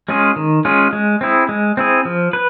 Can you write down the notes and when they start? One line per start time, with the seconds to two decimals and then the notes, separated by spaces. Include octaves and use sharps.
0.09 G#3 C#4 F4 G#4
0.36 D#3
0.65 G#3 C#4 F4 G#4
0.93 G#3
1.21 C4 E4 G#4
1.49 G#3
1.77 C4 E4 G#4
2.05 F3
2.33 B4